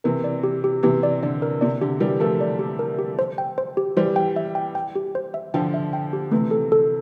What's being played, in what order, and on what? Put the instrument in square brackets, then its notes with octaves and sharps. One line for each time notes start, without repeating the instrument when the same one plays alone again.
[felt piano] C3 E3 [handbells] A#4
[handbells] D5
G4
G4
[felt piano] C3 E3 [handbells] G4
[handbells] D5
[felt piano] D3 [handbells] D5
[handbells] A#4
[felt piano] C3 [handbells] D5
[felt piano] D3 [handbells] G4
[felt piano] E3 G3 [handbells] A#4
[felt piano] F3 A3 [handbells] A#4
[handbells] D5
G4
A#4
G4
C5
G5
C5
G4
[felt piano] E3 G3 [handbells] C5
[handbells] G5
E5
G5
G5
G4
C5
E5
[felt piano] D3 F3 [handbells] G5
[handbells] E5
G5
G4
[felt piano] C3 E3 [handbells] A3
[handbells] A4
A4